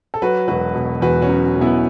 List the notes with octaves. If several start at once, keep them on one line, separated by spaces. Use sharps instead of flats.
A4
F#3 F#4 B4
E1 F#4 B4
B2
E2 F#4 B4
C#4 F#4
F#3
E1
B3 E4